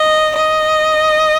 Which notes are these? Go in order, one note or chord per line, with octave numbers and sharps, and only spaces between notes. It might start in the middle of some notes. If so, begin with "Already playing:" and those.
Already playing: D#5
D#5